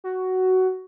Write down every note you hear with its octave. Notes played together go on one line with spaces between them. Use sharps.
F#4